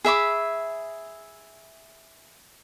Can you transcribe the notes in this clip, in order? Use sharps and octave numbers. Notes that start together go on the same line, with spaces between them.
G#4 E5 B5 D6